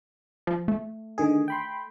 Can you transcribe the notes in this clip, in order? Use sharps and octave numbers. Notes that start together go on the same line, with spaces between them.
F3
A3
D3 D#3 G#4
G5 B5 C6